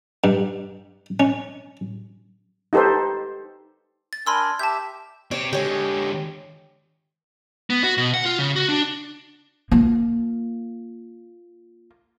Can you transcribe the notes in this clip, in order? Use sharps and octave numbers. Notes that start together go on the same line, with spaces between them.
G2
C#4
D#4 G4 A4 B4 C5
A6
D4 A#4 G#5 B5 C6 E6
G4 E5 A5 G6
C4 G4 C#5
D3 G#3 G4 C#5
B3
F#4
B2
F#5
F4
C#3
F#4
D4
A#3 F4